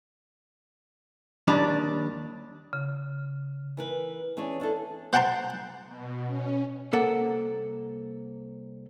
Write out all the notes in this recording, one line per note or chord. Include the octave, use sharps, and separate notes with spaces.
D#2 G3 D4 D5
C#3
E3 A#4 B4
E3 C#4 D4 G#4 C#5
A#3 D4 E4 A4
C5 F#5 G5 A5 A#5 C6
B2
C#4
C2 A#3 A4 F#5